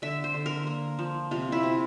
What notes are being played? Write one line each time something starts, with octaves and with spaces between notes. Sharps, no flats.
D3 E5
C5
D3
A#4
A#3
F3
C3 F4
E4
C3